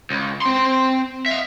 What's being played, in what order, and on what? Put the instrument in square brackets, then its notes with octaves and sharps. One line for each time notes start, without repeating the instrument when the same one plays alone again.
[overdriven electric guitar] C#2
C4 C6
E5 F5